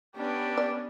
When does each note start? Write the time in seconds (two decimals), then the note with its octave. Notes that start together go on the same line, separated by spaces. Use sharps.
0.16 B3 C#4 D4 G4
0.58 D5